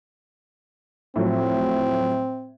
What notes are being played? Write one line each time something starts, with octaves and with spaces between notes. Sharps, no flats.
A2 F3 F#3 C4